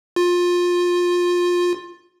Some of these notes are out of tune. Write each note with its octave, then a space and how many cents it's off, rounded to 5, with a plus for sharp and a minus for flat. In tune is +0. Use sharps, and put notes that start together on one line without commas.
F4 +20